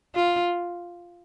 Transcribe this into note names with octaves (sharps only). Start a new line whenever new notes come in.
F4